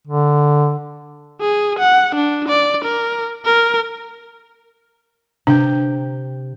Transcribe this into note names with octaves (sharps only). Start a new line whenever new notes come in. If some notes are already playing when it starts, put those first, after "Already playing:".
D3
G#4
F#5
D4
D5
A#4
A#4
C3 D4 G5